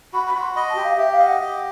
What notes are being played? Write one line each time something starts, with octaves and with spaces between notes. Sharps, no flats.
F#4 B5
B5
F#4
C6
D#5 B5
A5
G4
F5
G4 E5
F5
D#5
F#5
G4